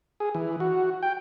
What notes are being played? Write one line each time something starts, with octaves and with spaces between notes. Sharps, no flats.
G#4
E3
F#4
G5